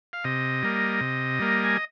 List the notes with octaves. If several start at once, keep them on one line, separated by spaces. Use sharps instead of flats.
F5
C3 D#5
G3 A#3
C3
G3 A#3
G#5